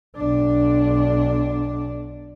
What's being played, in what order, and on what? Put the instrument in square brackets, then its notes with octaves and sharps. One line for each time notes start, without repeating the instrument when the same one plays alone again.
[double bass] B1 D4